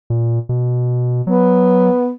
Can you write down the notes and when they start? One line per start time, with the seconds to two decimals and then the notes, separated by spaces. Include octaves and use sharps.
0.10 A#2
0.49 B2
1.27 F#3 B3